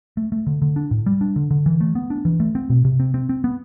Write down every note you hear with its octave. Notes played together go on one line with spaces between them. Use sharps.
A3
A3
D3
D3
D4
A2
G3
D4
D3
D3
E3
A3
B3
D4
E3
A3
C4
B2
C3
C4
C4
C4
B3